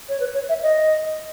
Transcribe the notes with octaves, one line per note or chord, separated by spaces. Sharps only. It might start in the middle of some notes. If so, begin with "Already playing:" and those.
C#5
B4
C#5
E5
D#5